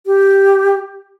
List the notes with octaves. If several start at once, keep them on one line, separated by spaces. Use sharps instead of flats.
G4